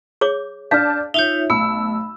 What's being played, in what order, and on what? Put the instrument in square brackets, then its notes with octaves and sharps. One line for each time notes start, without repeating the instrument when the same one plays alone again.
[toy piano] G#4 C#5 D6
[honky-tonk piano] D4 D5 A5 [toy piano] F5 [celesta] F6 G6
[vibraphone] D#4 F4 C#5 [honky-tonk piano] E5 [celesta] G6 F7
[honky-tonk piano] B1 E6 [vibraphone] A3 [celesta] B5